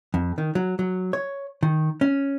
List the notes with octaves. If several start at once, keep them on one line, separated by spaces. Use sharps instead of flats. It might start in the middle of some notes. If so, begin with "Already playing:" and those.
F2
D#3
F#3
F#3
C#5
D#3
C#4